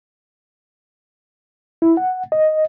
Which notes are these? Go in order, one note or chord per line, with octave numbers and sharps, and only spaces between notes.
E4
F#5
D#5